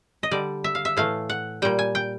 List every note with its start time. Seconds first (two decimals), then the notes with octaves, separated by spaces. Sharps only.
0.23 D#5
0.31 D3 G3 D5
0.64 E5
0.75 F5
0.85 E5
0.97 A2 E3 A3 F5
1.30 F#5
1.62 A#2 G3 G5
1.79 G#5
1.95 G5